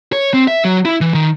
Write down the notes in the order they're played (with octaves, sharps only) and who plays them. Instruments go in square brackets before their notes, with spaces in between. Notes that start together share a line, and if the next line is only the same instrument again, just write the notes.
[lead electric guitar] C#5
C4
E5
F#3
E4
E3
D#3